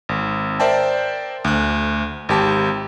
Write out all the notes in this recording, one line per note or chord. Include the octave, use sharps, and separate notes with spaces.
G#1
A#4 C5 D5 E5 G5 A5
D2 F#6
G#1 G4 A5